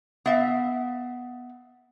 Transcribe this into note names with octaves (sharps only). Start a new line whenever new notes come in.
B3 E5 F5